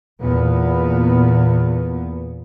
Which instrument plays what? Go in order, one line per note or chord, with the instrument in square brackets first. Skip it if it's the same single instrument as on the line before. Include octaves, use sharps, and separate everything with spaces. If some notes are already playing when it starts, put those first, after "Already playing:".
[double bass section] E2 A#2 B3